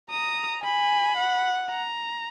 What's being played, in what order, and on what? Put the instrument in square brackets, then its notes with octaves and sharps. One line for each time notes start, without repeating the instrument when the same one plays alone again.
[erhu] A#5 [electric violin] D#6
[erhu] G#5 [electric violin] B5
[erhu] F#5
[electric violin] A#5